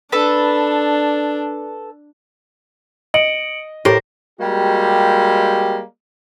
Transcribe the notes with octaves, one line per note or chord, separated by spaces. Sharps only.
D4 A4 B4
D#5 C#7 D7 F#7
A2 G4 A4 A#4 C5 A#6 C7
G3 G#3 A#3 F#4 G4